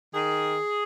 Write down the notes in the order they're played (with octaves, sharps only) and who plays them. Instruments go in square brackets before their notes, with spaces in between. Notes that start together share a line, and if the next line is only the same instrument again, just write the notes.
[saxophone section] D#3 G#4